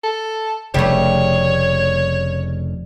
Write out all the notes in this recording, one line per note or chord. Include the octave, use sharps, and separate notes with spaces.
A4
F1 C#3 G3 A3 C#5